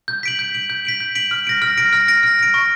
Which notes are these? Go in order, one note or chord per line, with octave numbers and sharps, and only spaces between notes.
G6
B6 D7 F#7
G6
B6 D7 F#7
G6
B6 D7 F#7
G6
B6 D7 F#7
F6
A#6 D7
F6
A#6 D7
F6
A#6 D7
F6
A#6 D7
C#6